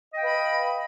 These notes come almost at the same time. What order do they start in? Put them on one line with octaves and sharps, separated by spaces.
D#5 G5 F5 B4 B5